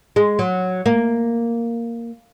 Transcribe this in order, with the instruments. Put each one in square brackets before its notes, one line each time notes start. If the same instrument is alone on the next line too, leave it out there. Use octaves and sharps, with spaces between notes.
[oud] G#3
F#3
A#3